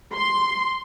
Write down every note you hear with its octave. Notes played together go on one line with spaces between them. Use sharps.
C6